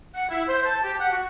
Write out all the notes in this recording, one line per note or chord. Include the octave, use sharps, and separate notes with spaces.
F#5
E4
C5
A5
G4
F#5
F#4